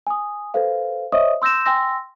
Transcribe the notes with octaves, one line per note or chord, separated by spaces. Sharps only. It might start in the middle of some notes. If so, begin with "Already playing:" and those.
G#5 D#6
A4 B4 C5 F5
C5 C#5 D#5 E5 C#6 D#6
C6 E6 G6 A#6 E7
G5 G#5 C6 E6 A#6